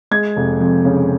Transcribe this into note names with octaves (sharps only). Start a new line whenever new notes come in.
G#3 G#6
F1
F2
C#3